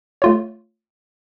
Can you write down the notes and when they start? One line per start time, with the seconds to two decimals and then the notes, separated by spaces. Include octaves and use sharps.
0.22 A3 F4 C#5